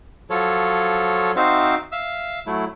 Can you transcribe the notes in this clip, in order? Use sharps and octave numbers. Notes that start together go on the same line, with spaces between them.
F3 F#3 F4 A4 C#5
C4 D#4 F#4 C5 E5 F5
E5 F5 E6
F#3 A3 E4